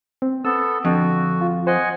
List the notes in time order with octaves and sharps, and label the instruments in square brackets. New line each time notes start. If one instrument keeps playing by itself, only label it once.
[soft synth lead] C4
[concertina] B3 A4 [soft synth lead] E6
[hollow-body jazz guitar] F2 [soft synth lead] D3 [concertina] F#4
[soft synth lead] F4
[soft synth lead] C5 [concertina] D#5 F#5 G#5